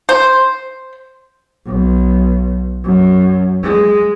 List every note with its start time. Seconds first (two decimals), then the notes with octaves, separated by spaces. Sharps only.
0.09 C5
1.66 B1
2.84 F#2
3.63 G#3